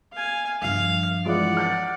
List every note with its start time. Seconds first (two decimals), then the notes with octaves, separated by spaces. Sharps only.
0.13 F5 G#5
0.62 G2 F3 F5
1.25 E3 G#3 F4 D5 F#5
1.57 F6 G6 A6